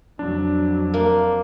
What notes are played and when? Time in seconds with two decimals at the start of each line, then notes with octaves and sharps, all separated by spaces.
0.19 F2 F#3 D4
0.94 A#3